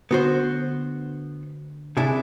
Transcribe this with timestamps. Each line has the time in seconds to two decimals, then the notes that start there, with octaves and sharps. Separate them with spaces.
0.11 D3 B3 F#4 C5
1.97 C3 D4 E4 G#4